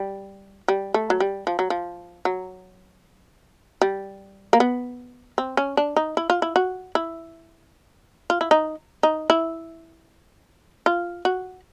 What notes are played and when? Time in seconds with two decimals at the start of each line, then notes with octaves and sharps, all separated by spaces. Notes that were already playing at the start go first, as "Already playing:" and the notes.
Already playing: G3
0.68 G3
0.94 A3
1.10 F#3
1.20 G3
1.47 F3
1.59 F#3
1.70 F3
2.25 F#3
3.81 G3
4.53 A#3
4.60 B3
5.38 C4
5.57 C#4
5.77 D4
5.96 D#4
6.17 E4
6.30 F4
6.42 E4
6.56 F#4
6.95 E4
8.30 F4
8.41 E4
8.51 D#4
9.03 D#4
9.30 E4
10.86 F4
11.25 F#4